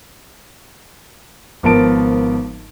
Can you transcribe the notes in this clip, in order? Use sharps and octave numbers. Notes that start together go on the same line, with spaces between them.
G#1 F3 B3 A#4 A5 D7